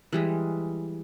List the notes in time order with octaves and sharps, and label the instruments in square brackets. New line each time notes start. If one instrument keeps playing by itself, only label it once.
[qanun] E3 G3 G#3